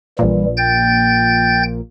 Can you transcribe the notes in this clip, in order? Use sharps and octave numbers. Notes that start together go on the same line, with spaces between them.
A#1 A#2 E3 G3
G5 G6 A6